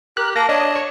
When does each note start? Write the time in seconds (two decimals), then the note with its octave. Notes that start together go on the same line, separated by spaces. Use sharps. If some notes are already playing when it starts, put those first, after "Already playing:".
0.17 G4 A#4 F#6
0.36 A#3 A5 A#6
0.49 D4 C#5 D#5
0.76 C#5